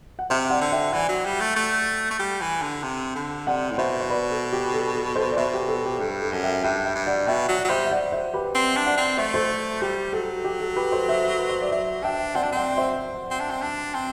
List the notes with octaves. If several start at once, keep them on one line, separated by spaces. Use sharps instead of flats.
F#5
C3 C5 E5
D5 F#5
D3
E5 G5
E3 D5 F#5
F#3
G3
A3
A3
A3
G3
E3
D3
C3
D3
C3 D5 F#5
A2
B2 C5 E5
C5
B4 D5
A4
G4
A4
A4
A4 C5
D5
B2 C5 E5
G4
A4
G4
G2 A4
A4
F#2
E5 G5
G2 E5 G5
E5 G5
G2
D5 F#5
B2 E5 G5
F#3 D5 F#5
F#3
G3 C5 E5
E5
D5 F#5
C5 E5
G4 B4
C4
D4
D5 F#5
C4
A3 C5 E5
A4 C5
G3 G4
F#3 A4
G4
A4
G4 B4
A4 C5
C5 E5
B4
C5
D5
F#3 C5 E5
D4 E5 G5
C4 D5 F#5
D4
C4 D5 F#5
C5 E5
C4
D4
C4
D4
C4